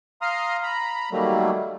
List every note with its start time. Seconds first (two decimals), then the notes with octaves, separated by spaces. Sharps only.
0.22 F5 A#5 C6 D#6 F6
0.63 A#5 B5
1.11 D#3 F#3 G3 A3 A#3